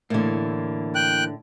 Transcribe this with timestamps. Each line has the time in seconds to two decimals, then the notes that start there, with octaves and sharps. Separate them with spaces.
0.10 A2 D3 E3 A#3
0.95 G5 F#6